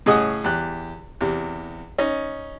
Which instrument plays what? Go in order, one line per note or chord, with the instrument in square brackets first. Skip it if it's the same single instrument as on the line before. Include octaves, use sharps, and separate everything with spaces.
[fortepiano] A2 C#3 G#4 D#5 F#5 D#6
E2 G4 F#6
E2 C3
C#4 D#4